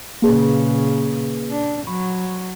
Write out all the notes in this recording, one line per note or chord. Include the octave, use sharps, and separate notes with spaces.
A#2 C#3 A#3 G#4 B4
D4
F#3 B5 C#6